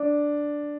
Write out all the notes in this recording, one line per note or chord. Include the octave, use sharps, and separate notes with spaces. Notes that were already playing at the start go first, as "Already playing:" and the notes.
Already playing: D4